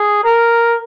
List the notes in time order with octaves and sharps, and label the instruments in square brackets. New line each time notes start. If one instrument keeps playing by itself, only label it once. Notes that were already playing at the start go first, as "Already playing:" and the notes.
Already playing: [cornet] G#4
A#4